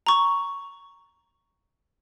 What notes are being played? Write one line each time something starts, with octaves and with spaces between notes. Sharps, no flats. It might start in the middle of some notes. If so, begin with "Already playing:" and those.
A#5 C#6